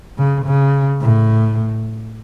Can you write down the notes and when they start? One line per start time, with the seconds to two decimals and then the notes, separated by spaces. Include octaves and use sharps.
0.18 C#3
0.46 C#3
1.02 A2